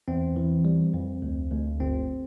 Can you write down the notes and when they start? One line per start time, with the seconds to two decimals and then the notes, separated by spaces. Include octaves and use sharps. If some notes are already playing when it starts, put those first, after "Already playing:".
0.08 E2 C4
0.36 E3
0.65 G3
0.94 F2
1.22 D2
1.51 D2
1.80 G1 C4